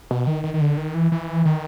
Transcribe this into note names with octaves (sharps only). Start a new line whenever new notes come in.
B2
D#3
D#3
D#3
D3
D#3
E3
E3
D#3